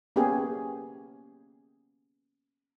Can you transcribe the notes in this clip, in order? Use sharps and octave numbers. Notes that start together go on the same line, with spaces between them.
A#3 B3 C#4 G4 G#4